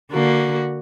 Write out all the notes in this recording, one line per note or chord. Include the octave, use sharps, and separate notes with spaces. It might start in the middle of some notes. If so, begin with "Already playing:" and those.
D3 A#3 F#4